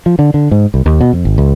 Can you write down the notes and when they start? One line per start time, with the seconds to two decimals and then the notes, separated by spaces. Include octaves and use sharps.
0.06 F3
0.19 D3
0.34 D3
0.51 G#2
0.74 C2
0.86 D#2
1.01 B2
1.13 F2
1.25 G#1
1.38 C#2